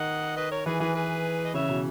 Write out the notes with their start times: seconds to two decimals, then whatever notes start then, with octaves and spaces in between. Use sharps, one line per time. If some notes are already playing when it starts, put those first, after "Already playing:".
Already playing: D#3 D#5 F#5
0.36 B4 D#5
0.51 A#4 C#5
0.65 E3 G#4 B4
0.80 E3 G#4 B4
0.95 G#4 B4
1.45 D#5
1.54 C#3 C#5 E5
1.69 B2